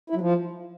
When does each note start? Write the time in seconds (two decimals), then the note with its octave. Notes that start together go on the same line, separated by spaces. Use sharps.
0.10 E4
0.15 F#3
0.21 F3